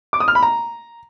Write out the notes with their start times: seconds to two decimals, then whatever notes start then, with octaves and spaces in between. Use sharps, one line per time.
0.13 D6
0.20 D#6
0.28 F6
0.35 B5
0.43 A#5